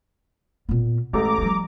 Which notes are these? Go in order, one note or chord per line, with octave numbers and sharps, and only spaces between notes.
A#2 B3
A1 G#3 A3 A#5 D6
F3 G3